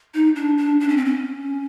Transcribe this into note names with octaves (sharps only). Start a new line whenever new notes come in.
D#4
D4
D4
D4
C#4
C4
C#4